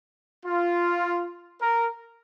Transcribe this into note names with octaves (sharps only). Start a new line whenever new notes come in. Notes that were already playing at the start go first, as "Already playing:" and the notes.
F4
A#4